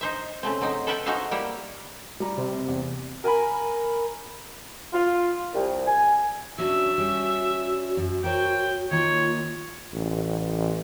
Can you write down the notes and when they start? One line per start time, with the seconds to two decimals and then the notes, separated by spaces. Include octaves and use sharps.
0.01 D#4 C5 E5
0.43 C#3 A3 C4
0.61 F#3 C4 D#4
0.87 A4 B4 E5 F#5 G5 A5
1.06 D#4 F#4 G#4 C5 E5 F5
1.31 G3 A#3 E4 G4
2.20 G3 A#5
2.38 C3
2.68 E2
3.24 A#4 G#5 A#5 B5
4.93 F4
5.54 C2
5.86 G#5
6.58 F#3 C#4 D4 F#4 E5
6.98 G3 C#4
7.97 F#2
8.24 A#4 C5 C#5 G5
8.91 D#3 A#3 F4 C#5
9.94 A1